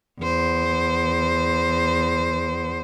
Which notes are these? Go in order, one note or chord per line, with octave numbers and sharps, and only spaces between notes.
E2 C5